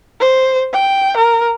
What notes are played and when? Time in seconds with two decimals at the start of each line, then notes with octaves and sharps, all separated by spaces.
0.20 C5
0.73 G5
1.17 A#4